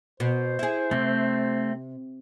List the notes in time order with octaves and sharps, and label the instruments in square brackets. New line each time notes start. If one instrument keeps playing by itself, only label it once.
[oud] B2 [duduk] C5
[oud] E4 G#4
[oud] C3 [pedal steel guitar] A3 C4